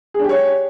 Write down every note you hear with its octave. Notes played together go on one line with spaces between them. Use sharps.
D4 G4 G#4 C#5